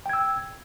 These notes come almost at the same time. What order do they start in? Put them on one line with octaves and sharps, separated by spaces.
G5 G#6 E6